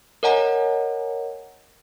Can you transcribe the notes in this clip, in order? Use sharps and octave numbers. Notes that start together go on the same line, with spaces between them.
A#4 C#5 D#5 F#5 G#5 A#5